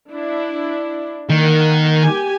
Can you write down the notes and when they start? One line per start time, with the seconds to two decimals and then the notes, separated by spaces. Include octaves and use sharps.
0.11 D4 E4
1.30 D#3 A#3 A#4 F#5
2.00 G4 G#5